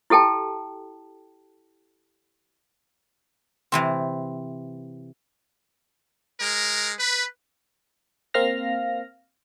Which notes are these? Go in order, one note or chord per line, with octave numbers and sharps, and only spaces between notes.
E4 G4 A4 G5 A5
C3 E3 C4
G#3 A#4
B4
A#3 C4 F5 F6 A#6